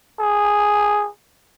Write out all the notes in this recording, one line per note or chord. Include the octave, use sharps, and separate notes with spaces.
G#4